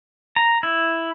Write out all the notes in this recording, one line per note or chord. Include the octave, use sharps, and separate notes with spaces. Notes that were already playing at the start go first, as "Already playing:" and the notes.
A#5
E4